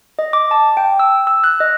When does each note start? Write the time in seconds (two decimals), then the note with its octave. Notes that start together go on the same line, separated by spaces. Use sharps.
0.19 D#5
0.33 D6
0.51 A5
0.77 G5
0.99 E6
1.27 E6
1.44 F#6
1.60 D#5